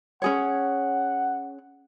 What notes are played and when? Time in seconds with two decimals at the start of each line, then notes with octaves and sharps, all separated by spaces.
0.22 C#4 G#4 C#5 F#5